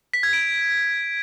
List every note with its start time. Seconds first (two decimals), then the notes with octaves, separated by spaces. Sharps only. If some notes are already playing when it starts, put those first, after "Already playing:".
0.14 B6
0.23 G#6
0.33 D7